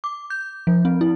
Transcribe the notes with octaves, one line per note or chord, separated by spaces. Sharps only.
D6
G6
F3
C4
E4